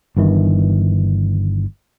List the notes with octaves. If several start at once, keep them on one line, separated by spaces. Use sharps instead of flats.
G1 G2 D#3 E3